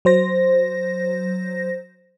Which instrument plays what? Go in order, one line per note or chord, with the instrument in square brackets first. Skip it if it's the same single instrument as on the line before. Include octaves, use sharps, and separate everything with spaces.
[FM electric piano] F#3 C5 A#6